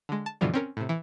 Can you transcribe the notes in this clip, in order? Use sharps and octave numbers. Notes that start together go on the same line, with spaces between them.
D3 G#3
A5
G2 B2 D3 E3 F3 G3
C4 C#4 A#4
A2 C3
E3